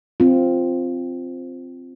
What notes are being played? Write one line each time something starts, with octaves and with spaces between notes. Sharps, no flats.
C4 F4